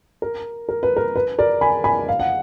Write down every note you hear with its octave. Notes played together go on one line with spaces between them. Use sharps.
A#4
A#4
B4
A#4
B4
A#4 D5
G#5 B5
G#5 B5
F5
F#5